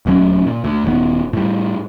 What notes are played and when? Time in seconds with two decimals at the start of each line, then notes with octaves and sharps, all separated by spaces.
0.06 D#1 D2 F#3 C#4
0.47 A#2
0.64 D2
0.84 D#1 D#2 B3
1.33 A2 G3